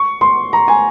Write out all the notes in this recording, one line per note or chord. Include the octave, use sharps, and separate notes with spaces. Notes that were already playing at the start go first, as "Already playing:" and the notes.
Already playing: C#6
C6
A#5
G#5